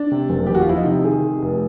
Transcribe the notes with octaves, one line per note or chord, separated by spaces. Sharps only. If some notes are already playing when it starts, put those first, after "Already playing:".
Already playing: D4
C3
F#1
E2 G4
F#4
F4
F3 E4
D#4
C3
D#3 G#4
C3
F1